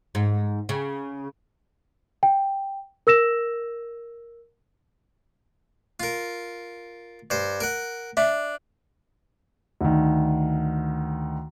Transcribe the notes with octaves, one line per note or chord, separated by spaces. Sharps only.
G#2
C#3
G5
A#4 E6 A#6 E7
F4 A#4
G2 C5
A#4 F#5
D4 E5
D2 D#3